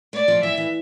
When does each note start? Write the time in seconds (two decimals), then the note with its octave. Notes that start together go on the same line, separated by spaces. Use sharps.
0.13 A3 D5
0.28 F3
0.43 E3 E5
0.57 E3